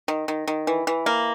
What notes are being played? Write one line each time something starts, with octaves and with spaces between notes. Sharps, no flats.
D#3
D#3
D#3
E3
E3
A#3